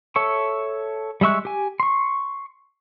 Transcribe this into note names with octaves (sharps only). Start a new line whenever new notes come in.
A4 C#5 E5 C#6
G3 G#3 E5 C#6 F#6
G4 G#5
C6 C#6